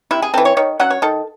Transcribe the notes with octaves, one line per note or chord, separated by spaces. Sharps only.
C3 E4
G#4
E3 C4 A4
C#5
D#3 C#5
F#3 C#4 F#5
C#5
D#3 A4